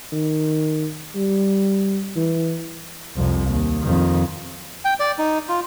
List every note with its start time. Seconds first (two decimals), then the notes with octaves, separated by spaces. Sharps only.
0.12 D#3
1.15 G3
2.16 E3
3.16 C2 F2
3.49 D#2
3.82 F2 D#3
4.85 G5
5.00 D5
5.19 D#4
5.49 F4